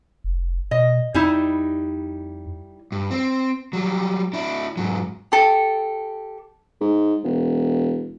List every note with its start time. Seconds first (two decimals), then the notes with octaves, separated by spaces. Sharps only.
0.24 F1
0.71 B2 D#5
1.14 F2 G3 D#4 E4
2.92 G2
3.11 C4
3.73 F#3 G3
4.33 D4 E4
4.77 G#2 F#3
5.32 G4 A4
6.81 G#2
7.24 E1